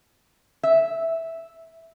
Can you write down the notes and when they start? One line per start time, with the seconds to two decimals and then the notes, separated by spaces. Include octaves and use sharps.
0.63 E5